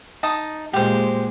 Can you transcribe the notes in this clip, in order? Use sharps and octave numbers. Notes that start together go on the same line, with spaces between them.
D#4 A5 D#6
A#2 G#3 G4 C5